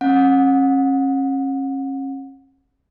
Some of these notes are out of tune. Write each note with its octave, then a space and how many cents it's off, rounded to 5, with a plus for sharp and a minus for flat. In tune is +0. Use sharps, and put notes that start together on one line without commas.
C#4 -35 F#5 -30